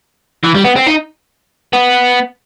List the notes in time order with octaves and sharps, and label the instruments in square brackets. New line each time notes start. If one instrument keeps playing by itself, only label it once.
[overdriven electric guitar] E3
G3
B3
C4
D#4
B3